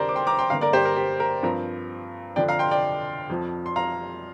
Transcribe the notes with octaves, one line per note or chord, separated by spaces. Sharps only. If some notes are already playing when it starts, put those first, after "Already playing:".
Already playing: F1 F2 D3 G4 A#4 C5 D5
D6
G5 C6
A#5 D6
G5 C6
G1 G2 D3 A#3 F5 A#5
A#4 D5
G4 C5
A#4
G4
A#4
G2 F3 C4 A#4
F2 D3 F3 D4 D5 G5
F5 A#5
G5 C6
D5 G5
F2 F3 C4
C6
F5 A#5